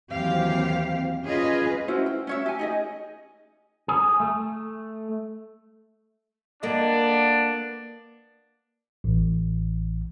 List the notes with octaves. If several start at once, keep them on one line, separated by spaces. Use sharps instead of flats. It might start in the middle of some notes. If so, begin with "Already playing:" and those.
D#2 E3 F#3 C4 G4 F5
C#4 F4 G#4 B4 D#5
C#4 E4 F#4 C5
G5
C#4 C#5 E5
G4 G#5
D#4 G#4 D#5
G#4
A3
A#3 B3 D4 A4 D5 D#5
A1